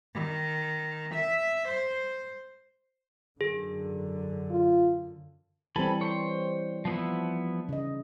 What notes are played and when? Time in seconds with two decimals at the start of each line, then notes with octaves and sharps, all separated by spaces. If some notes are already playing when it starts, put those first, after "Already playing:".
0.14 D#3
1.15 E5
1.68 C5
3.41 F#2 D3 G#4
4.50 F4
5.76 E3 G3 C4 A4 G#5 B5
6.01 C5 C#5
6.85 F3 B3 E4
7.69 C#3 D#5